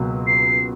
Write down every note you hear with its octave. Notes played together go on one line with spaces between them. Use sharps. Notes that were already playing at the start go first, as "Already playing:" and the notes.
Already playing: C#2 B2 F#3 A#3
C7